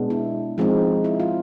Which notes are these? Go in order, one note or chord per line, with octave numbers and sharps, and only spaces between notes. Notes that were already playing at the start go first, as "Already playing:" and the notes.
Already playing: B2 G#3 B3 D4
E4
F3 G#3 C4 D#4
E4
F4